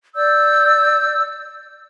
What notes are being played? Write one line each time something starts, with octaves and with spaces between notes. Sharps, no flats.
D5 E6 G6